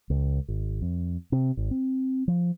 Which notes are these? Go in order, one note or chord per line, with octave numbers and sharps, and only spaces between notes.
C#2
G#1
F2
C3
G#1
C4
F3